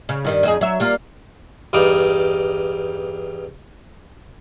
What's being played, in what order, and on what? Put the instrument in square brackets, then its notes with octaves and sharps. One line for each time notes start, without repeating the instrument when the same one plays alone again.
[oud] C#3
G2 D#3 G3
F2 D#4 G#4
F#3 E5
G3 A#3 F4
[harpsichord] E2 G2 G3 D#4 D5 F5